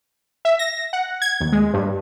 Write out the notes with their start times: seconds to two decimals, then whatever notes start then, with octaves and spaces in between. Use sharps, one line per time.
0.45 E5
0.59 A#6
0.93 F#5
1.22 G#6
1.41 D#2
1.52 G#3
1.74 G2